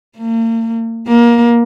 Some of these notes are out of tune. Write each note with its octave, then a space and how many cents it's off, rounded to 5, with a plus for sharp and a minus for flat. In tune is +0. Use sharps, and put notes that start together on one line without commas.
A#3 -40
A#3 +20